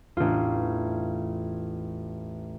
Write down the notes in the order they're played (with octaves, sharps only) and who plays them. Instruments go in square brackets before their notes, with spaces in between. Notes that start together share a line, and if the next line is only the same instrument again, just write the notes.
[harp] A1 F4 [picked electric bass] E2 D4